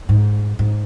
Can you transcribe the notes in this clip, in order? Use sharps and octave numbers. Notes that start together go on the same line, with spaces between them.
G#2
G#2